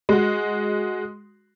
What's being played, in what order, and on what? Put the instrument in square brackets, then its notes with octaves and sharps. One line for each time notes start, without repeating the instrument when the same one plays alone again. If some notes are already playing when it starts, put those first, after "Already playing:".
[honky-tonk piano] G#3 F#4